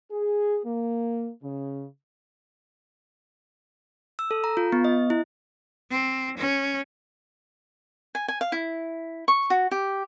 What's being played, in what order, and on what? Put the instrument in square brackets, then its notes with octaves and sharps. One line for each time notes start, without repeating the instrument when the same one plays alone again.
[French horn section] G#4
A#3
C#3
[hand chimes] E6
A4
A#5
F4
B3
D#5
E4
[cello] C4
C#4
[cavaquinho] G#5
G#5
F5
E4
C#6
F#4
G4